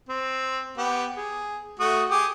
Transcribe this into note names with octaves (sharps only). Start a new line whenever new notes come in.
C4
B3 G4
G#4
A3 F#4 D#6
G4 G#4 D#6